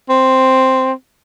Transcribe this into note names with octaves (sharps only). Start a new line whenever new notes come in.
C4